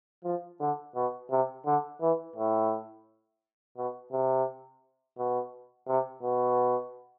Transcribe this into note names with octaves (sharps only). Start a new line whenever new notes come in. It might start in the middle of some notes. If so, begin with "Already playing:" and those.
F3
D3
B2
C3
D3
E3
A2
B2
C3
B2
C3
B2